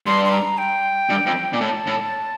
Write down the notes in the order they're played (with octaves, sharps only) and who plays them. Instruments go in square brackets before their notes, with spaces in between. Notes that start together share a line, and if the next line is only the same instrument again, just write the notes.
[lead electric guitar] G2 [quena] C6
[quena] C6
A#5
G5
[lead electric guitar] G2
F2
A#2
[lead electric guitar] A2 [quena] A5
[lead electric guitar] A2